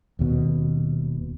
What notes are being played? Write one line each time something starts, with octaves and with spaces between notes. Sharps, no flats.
D#1 D#2 B2